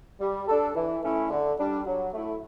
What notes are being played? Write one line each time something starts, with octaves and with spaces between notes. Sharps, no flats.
G3
D4 A4
E3
A3 C#4 E4
D3
G3 D4
F#3
A3 E4